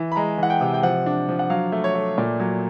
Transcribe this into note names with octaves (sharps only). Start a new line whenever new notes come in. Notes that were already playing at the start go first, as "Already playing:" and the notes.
Already playing: E3
B5
G#3 A#5
E3 F#5
G5
C3
G5
F3 F#5
D4
F3
F#5
F#3 F5
A3
C#5
A3
A#2 D5
F#3